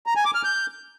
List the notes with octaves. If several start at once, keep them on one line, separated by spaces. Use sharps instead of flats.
A#5
G#5
D6
F6
G6